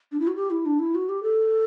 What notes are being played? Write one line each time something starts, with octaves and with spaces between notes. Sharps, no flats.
D4
E4
F#4
G4
E4
D4
E4
F#4
G4
A4